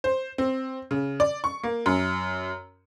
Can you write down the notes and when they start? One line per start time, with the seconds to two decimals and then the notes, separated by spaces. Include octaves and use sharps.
0.04 C5
0.38 C4
0.91 C#3
1.20 D5
1.44 C#6
1.63 A#3
1.86 F#2